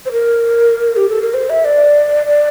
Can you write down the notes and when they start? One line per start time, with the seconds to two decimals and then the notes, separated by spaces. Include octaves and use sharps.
0.06 C5
0.12 A#4
0.97 G4
1.09 A4
1.22 A#4
1.34 C5
1.50 E5
1.65 D5
2.27 D5